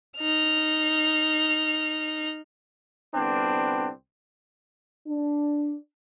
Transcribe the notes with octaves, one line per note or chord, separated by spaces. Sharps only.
D#4 F6
C2 D3 B3 C4 D4
D4